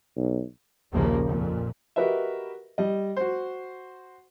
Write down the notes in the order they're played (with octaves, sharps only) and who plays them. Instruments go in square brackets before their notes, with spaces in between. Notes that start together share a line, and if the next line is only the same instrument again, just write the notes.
[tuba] B1
[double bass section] A#1 D#2 C#3 F3 A#3
F2 A#2
[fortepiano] F#4 G4 A#4 B4 D#5 E5
G3 D#5
F#4 C5